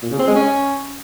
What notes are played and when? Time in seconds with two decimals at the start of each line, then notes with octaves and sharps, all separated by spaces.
0.02 A#2
0.11 C#3
0.19 C4
0.27 G#3
0.35 C#4